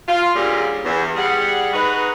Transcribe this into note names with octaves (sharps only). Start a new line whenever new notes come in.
F4
D2 A#2 D3 G3 C#4 G#4
E2
G3 G#4 F#5
D#4 F#4 G#4 B4